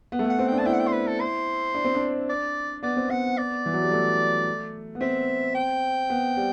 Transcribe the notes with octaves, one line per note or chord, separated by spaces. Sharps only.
B3
A3
B3 F#5
C4
D4 G5
D4 A5
E4 G5
F#5
G5
C5
B4
A4
C5
D4
C4
D4
D5
B3 D5
C4
B3 F#5
D5
E3
F#3
G3
A3
B3
C4 E5
G5
B3
G3